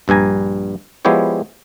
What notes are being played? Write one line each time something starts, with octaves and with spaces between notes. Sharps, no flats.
A#1 G2 G3 G#5 A#5
F3 G#3 B3 E4 G4 C#5